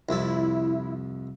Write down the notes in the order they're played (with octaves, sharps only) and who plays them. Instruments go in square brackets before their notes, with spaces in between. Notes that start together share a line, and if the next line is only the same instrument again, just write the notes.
[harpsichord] C2 F2 A4 [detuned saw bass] E4